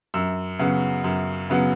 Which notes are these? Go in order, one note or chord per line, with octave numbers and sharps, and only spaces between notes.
F#2 E6
C#3 F#3 B3
F#2
C#3 F#3 B3